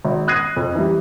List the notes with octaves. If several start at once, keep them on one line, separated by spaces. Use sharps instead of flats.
G#1
D#6 F#6 G#6 A#6 C7 D#7
F2
E3 G3